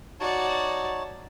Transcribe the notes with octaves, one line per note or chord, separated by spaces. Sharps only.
D#4 F#4 C#5 D5 A5